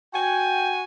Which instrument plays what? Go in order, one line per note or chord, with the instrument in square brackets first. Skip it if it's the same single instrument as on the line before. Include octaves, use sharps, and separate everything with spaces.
[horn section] F#4 G#5 [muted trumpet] G5